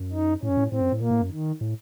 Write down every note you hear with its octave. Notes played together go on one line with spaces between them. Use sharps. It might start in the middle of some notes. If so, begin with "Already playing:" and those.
Already playing: F#2
D#4
A2 C#4
F#2
A2
A2 C4
F#2
A2
A#2 A#3
A2
F#2
D#3
A2